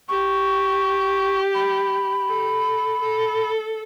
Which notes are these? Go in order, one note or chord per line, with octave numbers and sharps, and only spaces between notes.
G4 C#6
B5
A4
A4